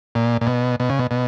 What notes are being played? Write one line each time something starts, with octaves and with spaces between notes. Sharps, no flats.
A#2
A#2
B2
B2
C#3
B2
B2